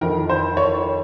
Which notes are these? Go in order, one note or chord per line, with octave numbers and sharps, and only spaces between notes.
F2 D#3 A#4
C5
C#5